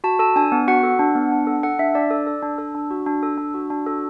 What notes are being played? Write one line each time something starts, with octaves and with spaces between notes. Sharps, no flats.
F#4 A5
A4 A5
D4 G#5
B3
F#4 F#5
A4
D4
B3
D4
A4
A4 F#5
D4 E5
D4 D5
A4
A4
D4
A4
D4
F#4
D4
A4
D4
F#4
D4
F#4 A4